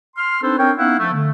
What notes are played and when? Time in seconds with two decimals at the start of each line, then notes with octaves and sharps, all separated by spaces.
0.17 C6 F6
0.43 C4 D4 D#4 A4 B4 C5
0.58 C4 D4 A#4 C#5 G5
0.78 B3 C#4 D#4 E4 F5 F#5
0.99 F3 A3
1.13 D3 A3